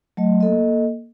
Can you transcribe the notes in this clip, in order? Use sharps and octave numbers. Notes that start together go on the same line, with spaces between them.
F#3 A3 D#5
A#3 A4 D#5